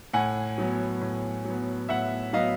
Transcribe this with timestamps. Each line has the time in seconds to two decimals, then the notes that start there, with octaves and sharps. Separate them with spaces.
0.13 A2 F#5 G#5
0.58 F#3 B3
1.01 A2
1.45 F#3
1.50 B3
1.89 A2 E5 F#5
2.33 F#3 B3 D#5 F5